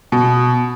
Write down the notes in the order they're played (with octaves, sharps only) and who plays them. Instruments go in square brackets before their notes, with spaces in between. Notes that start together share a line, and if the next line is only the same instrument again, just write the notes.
[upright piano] B2